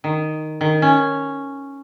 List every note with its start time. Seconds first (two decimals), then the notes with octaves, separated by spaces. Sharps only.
0.04 D#3
0.61 D#3
0.82 C#4